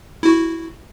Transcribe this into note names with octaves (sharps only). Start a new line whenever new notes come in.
E4 F#4